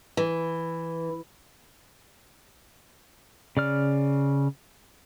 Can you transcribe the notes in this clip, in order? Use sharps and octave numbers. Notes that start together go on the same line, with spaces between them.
E3
C#3 D5 F6